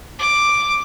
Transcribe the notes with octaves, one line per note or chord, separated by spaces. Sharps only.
D6